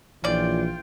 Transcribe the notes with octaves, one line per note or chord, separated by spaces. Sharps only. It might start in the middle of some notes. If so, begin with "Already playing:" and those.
A#1 E3 C#4 F4 D5 G5